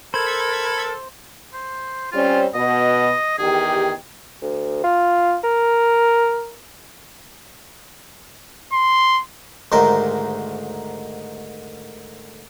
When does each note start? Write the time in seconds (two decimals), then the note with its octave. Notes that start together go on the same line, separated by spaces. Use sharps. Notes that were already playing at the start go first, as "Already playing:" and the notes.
0.14 A4 A#4 C5 B5 G#6
1.54 C5
2.12 G3 C4 C#4 F4
2.55 B2 D#5
3.39 E2 D#3 G4 G#4
4.42 D2
4.84 F4
5.43 A#4
8.73 C6
9.72 D2 G#2 D#3 A#4 C5